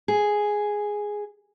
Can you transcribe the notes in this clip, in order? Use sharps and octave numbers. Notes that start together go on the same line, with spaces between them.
G#4